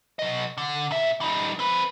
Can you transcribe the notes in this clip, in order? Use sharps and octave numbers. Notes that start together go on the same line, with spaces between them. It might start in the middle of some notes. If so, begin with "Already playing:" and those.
F#3 D#5
D3
A#2 E5
G3 D#4
C4 B4